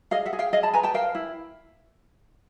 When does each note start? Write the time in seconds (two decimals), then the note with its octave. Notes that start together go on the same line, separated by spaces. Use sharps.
0.11 G#4 D#5 F5
0.26 E5 F#5
0.33 G#4
0.39 F5 G5
0.53 G#4 D#5 F5
0.63 A5 B5
0.73 B4 G#5 A#5
0.83 G5 A5
0.94 A#4 F5 G5
1.15 E4